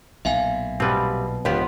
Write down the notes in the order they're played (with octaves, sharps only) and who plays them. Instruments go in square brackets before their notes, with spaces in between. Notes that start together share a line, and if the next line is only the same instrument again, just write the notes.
[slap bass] B1 A#2 [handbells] E5 F5 G#5
[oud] B2 B4 [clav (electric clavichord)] G3 C4
[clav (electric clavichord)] C#2 G4 [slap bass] D3 [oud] F3 B3